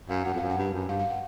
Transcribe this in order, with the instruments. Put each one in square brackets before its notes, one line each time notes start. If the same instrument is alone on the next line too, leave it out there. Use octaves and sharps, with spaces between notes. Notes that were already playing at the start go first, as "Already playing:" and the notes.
[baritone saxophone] F#2 [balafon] F5
[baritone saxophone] F#2 [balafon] F#5
[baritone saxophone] F2
[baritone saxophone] F#2 [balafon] F5
[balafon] F#5
[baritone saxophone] G2
F#2
[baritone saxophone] G2 [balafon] F5
[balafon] F5
F#5